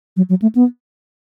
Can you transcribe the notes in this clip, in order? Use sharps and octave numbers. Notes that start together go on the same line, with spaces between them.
F#3
F#3
A3
B3